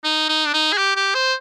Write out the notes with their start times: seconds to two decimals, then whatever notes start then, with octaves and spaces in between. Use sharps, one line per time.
0.04 D#4
0.29 D#4
0.46 D4
0.54 D#4
0.73 G#4
0.78 G4
0.96 G4
1.15 C5